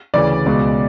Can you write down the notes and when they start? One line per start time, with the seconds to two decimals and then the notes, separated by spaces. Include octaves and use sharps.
0.14 D2 C#3 E3 D5
0.46 C#2 B2 G#3